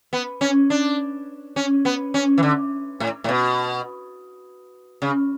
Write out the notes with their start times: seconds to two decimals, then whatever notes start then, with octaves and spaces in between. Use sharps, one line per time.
0.13 B3
0.41 C#4
0.70 D4
1.56 C#4
1.85 B3
2.14 C#4
2.38 E3
2.43 D3
3.00 A2
3.24 A2
3.29 B2
5.02 C#3